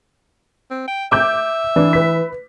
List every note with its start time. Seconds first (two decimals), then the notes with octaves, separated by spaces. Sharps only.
0.71 C4
0.88 G5
1.12 E5 D6 G6
1.76 E3 D4
1.93 B4 B6